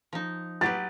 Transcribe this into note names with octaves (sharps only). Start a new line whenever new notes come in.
F3 D#4
F#3 G4 B4 A6